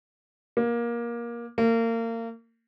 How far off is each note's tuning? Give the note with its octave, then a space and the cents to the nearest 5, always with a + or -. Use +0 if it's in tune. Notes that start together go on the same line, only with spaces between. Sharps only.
A#3 +20
A#3 -30